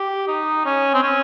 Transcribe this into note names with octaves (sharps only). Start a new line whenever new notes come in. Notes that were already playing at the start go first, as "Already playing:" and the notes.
Already playing: G4
D#4
C#4
C4
C#4